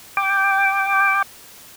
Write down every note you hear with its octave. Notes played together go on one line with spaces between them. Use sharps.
G5 D6